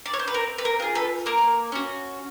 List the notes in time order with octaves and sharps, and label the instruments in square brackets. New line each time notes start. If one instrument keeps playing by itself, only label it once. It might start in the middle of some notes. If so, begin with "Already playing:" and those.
[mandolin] D5
C#5
C5
B4
C4 A#4
B4
A#4
F4 G#4
A4 B4
A#3 A#4
C#4 F#4